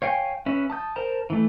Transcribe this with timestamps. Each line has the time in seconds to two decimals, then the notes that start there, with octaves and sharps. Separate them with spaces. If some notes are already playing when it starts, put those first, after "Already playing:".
0.02 C#5 F5 G5 G#5
0.46 C#4 B4 E5
0.70 A5 D#6 G6
0.96 A#4 C5 A5 A#5
1.30 E3 A3